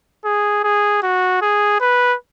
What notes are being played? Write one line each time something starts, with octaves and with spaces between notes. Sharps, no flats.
G#4
G#4
F#4
G#4
B4